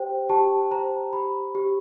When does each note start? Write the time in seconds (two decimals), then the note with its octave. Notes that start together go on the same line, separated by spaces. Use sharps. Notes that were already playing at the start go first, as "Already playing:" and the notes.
Already playing: G4 C5 G5
0.29 G4 A5
0.71 C5 A#5
1.13 G4 B5
1.55 G4